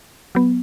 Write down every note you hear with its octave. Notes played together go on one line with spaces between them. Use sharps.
F#3 B3